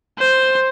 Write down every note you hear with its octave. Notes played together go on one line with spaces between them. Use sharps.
C5